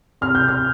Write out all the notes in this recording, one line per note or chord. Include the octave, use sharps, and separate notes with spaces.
C3 F6
G6
F6